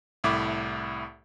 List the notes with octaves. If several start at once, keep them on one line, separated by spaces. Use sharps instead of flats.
C2 A2 E4 D6